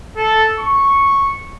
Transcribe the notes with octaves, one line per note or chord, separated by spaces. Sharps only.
A4
C#6